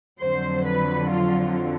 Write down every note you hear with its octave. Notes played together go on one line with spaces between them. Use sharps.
F2 D3 F#3 C5
B4
F4